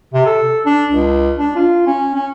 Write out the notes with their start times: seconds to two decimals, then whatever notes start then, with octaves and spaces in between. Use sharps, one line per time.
0.14 C3
0.26 A4
0.66 D4
0.92 C#2
1.38 D4
1.56 F4
1.87 C#4
2.15 C#4